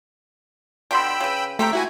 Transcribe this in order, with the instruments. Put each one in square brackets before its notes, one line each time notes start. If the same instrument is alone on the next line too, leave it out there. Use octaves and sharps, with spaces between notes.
[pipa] B2 D3 C6 [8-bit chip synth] G5 B5 E6
[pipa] C#3 B4
[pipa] C3 A4 A#5 [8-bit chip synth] A3 G5 B6
[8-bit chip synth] E4 F#4 G#5